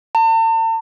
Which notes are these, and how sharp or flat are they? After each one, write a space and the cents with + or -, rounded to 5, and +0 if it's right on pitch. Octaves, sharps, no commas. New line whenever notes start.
A5 +40